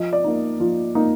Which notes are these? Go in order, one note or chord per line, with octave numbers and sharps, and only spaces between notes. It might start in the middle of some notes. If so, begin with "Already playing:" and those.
Already playing: F3 D#5
D5
A#3 D#4
F3 F4
A#3 D#4